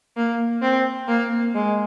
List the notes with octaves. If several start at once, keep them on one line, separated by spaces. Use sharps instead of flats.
A#3
C4
A#3
G#3